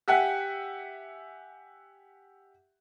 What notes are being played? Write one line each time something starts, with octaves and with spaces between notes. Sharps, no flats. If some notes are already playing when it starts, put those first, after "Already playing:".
G4 E5 F#5 G#5 F#6